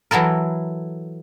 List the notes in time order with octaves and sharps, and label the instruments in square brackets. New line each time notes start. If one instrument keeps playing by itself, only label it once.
[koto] E3 F#3 E4 A4 A#4